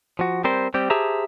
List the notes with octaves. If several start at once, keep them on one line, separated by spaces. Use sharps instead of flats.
F3 F#4
G3 C4 A#4 C5
G3 C4 G4
G4 G#4 C5 E5 A5 A#5